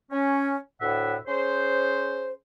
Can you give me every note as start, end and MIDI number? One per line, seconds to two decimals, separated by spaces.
0.11 0.56 61
0.81 1.16 38
0.81 1.16 45
0.81 1.16 76
0.81 1.16 78
1.28 2.32 61
1.28 2.32 68
1.28 2.32 72